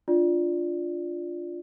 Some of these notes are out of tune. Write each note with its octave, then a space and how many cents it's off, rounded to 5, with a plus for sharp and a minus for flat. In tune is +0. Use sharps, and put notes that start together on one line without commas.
D4 +0 F4 +0 D5 +0